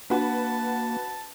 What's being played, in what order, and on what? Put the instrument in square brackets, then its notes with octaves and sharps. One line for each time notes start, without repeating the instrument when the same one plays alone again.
[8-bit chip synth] A#3 [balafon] D4 F#5 [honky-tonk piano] F#4 B4 [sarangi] A5